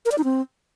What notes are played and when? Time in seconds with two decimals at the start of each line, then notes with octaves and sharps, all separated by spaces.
0.05 A#4
0.12 D5
0.18 D#4
0.24 C4